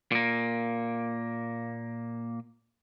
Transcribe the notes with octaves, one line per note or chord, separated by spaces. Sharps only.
A#2 A#3